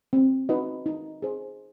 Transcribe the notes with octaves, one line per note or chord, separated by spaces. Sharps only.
C4
D#4 F#4 B4 D#5
D#4
G#4 C5